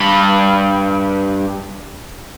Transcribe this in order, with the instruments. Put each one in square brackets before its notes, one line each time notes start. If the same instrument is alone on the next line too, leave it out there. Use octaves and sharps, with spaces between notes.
[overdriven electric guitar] G2 B5